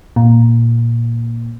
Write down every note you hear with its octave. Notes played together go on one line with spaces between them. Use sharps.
A#2